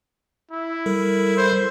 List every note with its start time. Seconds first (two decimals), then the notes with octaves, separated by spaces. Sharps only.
0.51 E4
0.86 G3 A4 A#4
1.37 C5